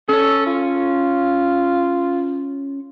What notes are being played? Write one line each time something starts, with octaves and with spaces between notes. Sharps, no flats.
C#4 A4 C#5
F4